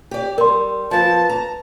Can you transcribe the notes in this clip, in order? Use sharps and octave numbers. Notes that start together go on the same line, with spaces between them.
G4 D5
G3 A#4 C6
F3 B3 A5
A#5